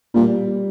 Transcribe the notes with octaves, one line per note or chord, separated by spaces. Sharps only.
A#2 G3